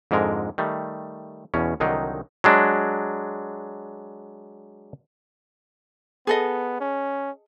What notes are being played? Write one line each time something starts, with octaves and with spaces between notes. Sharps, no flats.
F2 G#2 D3 G#3 A#4
D#3 G3 A3
E2 B2 C#4
C2 D3 D#3 F#3 D#4 G5
F#3 G#3 D4
B3 G#4 A4 D#5
C#4